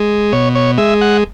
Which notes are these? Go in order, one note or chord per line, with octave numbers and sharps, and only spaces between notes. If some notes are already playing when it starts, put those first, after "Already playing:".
Already playing: G#3
B2 C#5
C#5
G#3 E5
F#5